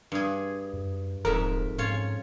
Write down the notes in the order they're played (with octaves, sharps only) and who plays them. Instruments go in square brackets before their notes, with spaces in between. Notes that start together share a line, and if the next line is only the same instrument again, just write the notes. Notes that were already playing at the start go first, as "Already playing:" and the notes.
[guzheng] G2 G#4
[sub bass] F#2
[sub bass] D#1 [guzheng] F2 G#2 E5 [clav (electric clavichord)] A#4
[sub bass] G#2 [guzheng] C#4 F4 C#5